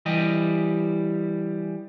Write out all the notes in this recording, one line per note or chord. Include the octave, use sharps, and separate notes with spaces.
E3 G3 G4 D#5